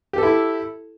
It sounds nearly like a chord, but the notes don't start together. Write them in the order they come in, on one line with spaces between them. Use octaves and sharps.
G4 A4 E4